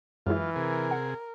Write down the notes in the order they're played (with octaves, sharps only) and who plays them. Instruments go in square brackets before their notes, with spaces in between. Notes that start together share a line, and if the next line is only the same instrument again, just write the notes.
[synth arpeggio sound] F#2 G#3 E4 [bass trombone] E3 [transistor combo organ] F4
[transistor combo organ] C3 G#4 [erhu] A#4
[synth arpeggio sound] F#5